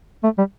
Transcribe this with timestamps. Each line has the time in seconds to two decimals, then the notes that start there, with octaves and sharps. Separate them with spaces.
0.23 A3
0.38 G3